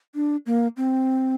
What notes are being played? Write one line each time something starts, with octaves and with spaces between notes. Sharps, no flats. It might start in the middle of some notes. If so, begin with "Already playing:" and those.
D4
A#3
C4